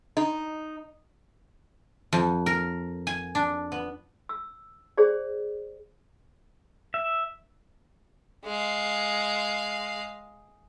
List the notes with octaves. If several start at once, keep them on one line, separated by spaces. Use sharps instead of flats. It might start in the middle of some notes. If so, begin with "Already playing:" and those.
D#4
F2
A#4
G#5
D4
B3
E6
G#4 C5 D5
E5
G#3 F5